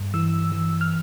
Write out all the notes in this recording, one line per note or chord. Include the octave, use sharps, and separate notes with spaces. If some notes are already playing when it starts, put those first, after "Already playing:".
Already playing: G2
E3 E6
E3
F6